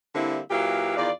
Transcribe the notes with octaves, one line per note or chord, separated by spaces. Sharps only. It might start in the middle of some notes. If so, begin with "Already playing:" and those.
D3 G3 A#3 C4 E4
A#2 F#3 E4 G4 B4 F5
E2 D#3 F4 D5